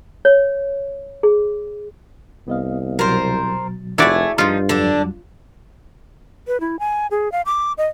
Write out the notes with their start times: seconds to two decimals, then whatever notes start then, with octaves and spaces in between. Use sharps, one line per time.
0.25 C#5
1.23 G#4
2.48 C2 B3 D#5 F5
2.99 B2 F#3 A#4 C5 A6
3.98 F1 A3 E4 F#4 G#4 D5 G#5
4.38 G2 F3 D#4 F4
4.69 F2 D3 F#3 G3 D4
6.48 B4
6.60 E4
6.79 G#5
7.11 G#4
7.32 F5
7.46 D6
7.78 D#5